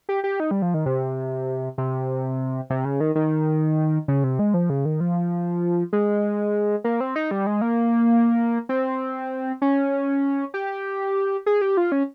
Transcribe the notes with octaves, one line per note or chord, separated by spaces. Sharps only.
G4
G4
D#4
G3
F3
D#3
C3
C3
C3
C#3
D#3
D#3
C#3
C3
G#3
F3
C#3
D#3
F3
G#3
A#3
C4
D#4
G3
G#3
A#3
C4
C#4
G4
G#4
G4
F4
C#4